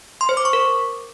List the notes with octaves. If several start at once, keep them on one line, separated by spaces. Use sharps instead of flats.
C6
C5
D6
C#6
A#4